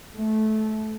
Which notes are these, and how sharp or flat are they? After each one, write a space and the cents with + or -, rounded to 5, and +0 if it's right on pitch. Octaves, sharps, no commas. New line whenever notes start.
A3 -20